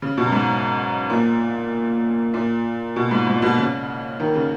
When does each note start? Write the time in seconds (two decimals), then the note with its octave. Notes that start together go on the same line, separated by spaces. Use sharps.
0.02 C#3
0.17 B2
0.26 F#2
0.32 G#2
1.10 A#2
2.34 A#2
2.96 B2
3.11 G#2
3.27 G#2
3.36 A#2
3.42 B2
3.58 C#3
4.20 D#3
4.35 C#3